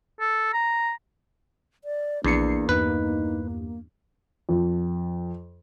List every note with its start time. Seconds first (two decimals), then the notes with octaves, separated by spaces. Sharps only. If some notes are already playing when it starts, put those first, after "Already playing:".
0.20 A4
0.53 A#5
1.84 D5
2.24 A#1 E2 A#3 D4 C7 C#7
2.69 E2 G2 D#4 B4
4.49 F2